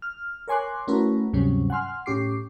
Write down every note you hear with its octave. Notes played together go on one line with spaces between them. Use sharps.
F6
A#4 C#5 G#5 C6 D6 F#6
A3 C#4 E4 F#4 A#4 B4
D2 G2 C3 F#3 G3 C#4
F#5 G#5 C6 F6
A2 C#4 G4 D6 C7